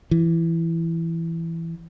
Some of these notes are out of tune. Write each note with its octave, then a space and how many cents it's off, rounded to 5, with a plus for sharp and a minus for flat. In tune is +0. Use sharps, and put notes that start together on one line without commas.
E3 +10